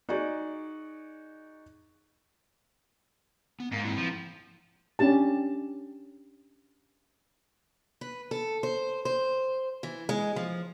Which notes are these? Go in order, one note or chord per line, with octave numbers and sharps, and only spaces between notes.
D#4 F#4 G#4 D5
B3
G#2 A#3 F5
E3 C4 E4
F3
C#4 D4 G4 A5
B4
A4
C5
C5
E3
G#3
F3